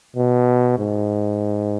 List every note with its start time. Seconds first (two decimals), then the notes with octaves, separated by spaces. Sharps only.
0.16 B2
0.78 G#2